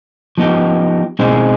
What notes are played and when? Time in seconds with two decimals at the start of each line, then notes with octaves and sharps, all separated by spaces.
0.38 F3 B3 D#4 G4
1.19 B2 G#3 C4 D#4 G#4